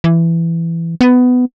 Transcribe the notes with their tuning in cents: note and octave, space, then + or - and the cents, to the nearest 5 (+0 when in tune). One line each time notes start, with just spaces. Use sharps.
E3 +15
B3 +15